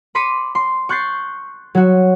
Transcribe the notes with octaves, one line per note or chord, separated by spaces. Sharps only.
B5 C6 D6 B6 C#7 D#7
C6
C#6 F#6 G6 A6 C7
F#3 F#4